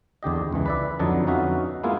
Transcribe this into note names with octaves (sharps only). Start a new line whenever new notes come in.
E2 D3 G4 D#5
C#2 E3
B4 D5 E5
F2 D3 F#3 D#4 A5
B3 C#4 D#4 F#4 E5 F5
G#3 A#3 B3 E4 F4